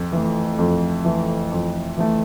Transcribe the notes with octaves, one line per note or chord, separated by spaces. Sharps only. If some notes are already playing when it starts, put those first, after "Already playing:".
Already playing: F2
E3 A3
F2
E3 A3
F2
E3 A3